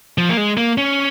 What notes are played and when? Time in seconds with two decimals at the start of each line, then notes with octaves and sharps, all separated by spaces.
0.18 F3
0.29 A#3
0.37 G#3
0.57 A#3
0.78 C#4